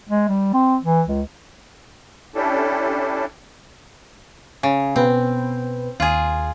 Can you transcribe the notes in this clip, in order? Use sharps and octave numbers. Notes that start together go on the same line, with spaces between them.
G#3
G3
C4
E3
C#2
C#4 D4 E4 G4 A4
C#3
B2 B3 C4 B4
D#2 F4 G#4